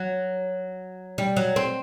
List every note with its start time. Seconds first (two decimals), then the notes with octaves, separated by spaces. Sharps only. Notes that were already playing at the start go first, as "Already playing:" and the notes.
Already playing: F#3
1.18 G3
1.37 F#3
1.56 C4